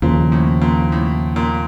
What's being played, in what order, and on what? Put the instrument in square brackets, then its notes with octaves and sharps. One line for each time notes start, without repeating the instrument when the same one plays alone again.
[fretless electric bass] D#2 C#3 F3 [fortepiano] A#2
[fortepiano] A2
A#2
A2
A#2